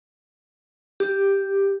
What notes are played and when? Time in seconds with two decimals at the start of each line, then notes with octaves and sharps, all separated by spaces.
1.00 G4